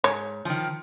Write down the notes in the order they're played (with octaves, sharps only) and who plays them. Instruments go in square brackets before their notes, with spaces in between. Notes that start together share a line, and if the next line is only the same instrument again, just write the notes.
[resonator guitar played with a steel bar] G#2 [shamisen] C#5
[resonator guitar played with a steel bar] D#3 F3